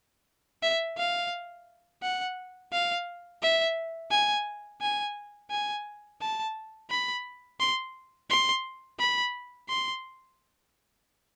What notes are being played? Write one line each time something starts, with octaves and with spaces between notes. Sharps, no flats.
E5
F5
F#5
F5
E5
G#5
G#5
G#5
A5
B5
C6
C6
B5
C6